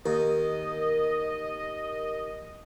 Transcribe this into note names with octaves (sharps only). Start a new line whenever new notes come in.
D#2 A#4 D#5